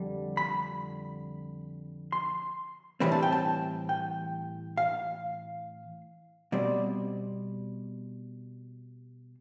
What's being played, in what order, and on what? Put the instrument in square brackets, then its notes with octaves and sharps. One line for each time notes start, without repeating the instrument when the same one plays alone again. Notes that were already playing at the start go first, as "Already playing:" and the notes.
Already playing: [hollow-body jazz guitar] F2 D3 G3
B5
C6
A2 E3 G3 C4 B5
A5
G5
A5
G5
F5
B2 G3 C4 D5